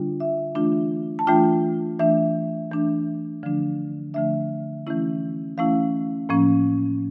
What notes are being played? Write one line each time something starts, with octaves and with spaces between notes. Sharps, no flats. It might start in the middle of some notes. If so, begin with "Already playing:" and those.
Already playing: D3 G3 D4 F4
E5
E3 A3 D4 F4
A5
E3 A3 D4 F4 G5
E3 A3 D4 E5
E3 A3 D4
D3 F3 A3 D4
D3 F3 A3 D4 E5
E3 A3 C#4 E4
E3 A3 C#4 E4 F5
A2 F3 A#3 C#4